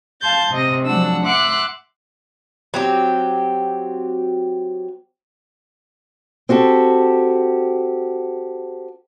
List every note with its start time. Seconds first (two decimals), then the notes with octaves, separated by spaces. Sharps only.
0.21 F5 A5 C6 G6 A6
0.51 C3 D#5 A#6
0.85 F3 F#3 G#3 D4 F#5 E6
1.24 E5 F#5 C6 D6 E6 F#6
2.74 F#3 C4 G4
6.49 C4 F#4 G4 A4